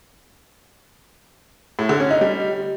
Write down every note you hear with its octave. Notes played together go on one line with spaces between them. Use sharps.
A2
D3
C#4
D#4
G3